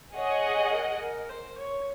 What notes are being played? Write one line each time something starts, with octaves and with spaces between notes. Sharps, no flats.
G#4 C#5 D#5 F#5
A#4
A#4
C5
C#5